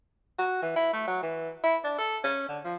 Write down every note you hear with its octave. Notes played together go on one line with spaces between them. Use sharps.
F#4
E3
E4
A3
F#3
E3
E4
D4
A4
C#4
D3
F3